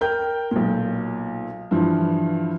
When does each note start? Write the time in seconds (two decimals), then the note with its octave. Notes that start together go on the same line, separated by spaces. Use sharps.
0.01 A#4 G5 G6
0.51 B1 A#2
1.71 G2 E3 F3